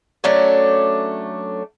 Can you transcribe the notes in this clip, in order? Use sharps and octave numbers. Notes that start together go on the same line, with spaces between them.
F#3 A3 C#4 D4